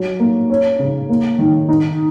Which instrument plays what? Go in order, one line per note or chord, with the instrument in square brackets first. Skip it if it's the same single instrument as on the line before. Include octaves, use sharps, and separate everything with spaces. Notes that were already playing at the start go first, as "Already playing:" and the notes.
Already playing: [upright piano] F#3
A#3
C#4
C#3
A#3
D#3
D#4